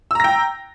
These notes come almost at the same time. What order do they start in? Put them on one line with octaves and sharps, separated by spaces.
E6 A#5 A#6 G5